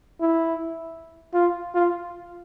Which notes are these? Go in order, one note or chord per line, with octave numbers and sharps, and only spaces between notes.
E4
F4
F4